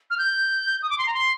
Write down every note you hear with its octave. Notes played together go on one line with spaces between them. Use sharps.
F6
G6
D#6
D6
C6
A#5
C6